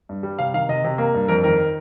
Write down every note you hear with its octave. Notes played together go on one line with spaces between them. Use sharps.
G2
G3
C3 F5
D#3 F5
C3 D#5
C3
A#3
G2
F2 A#4
D#3 A#4